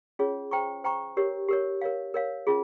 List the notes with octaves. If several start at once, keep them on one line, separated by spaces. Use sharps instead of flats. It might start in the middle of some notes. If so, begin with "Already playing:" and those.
C#4 F4 G#4 C#5
C5 G5 A#5 C#6
C5 G5 A#5 C#6
G4 A#4 C#5
G4 A#4 C#5
A#4 C#5 F5
A#4 C#5 F5
C#4 F4 G#4